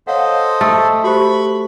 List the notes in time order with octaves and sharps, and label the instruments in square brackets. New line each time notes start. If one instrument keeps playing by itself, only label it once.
[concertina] A4 C5 D#5 [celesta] C#5 F5 F#5
[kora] A3 [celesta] D#6 E6 A6
[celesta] F#4 G4 C5 [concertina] B5 C#6